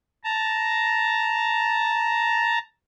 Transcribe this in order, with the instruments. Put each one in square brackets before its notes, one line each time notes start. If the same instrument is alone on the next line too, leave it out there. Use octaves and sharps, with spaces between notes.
[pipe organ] A5 A#5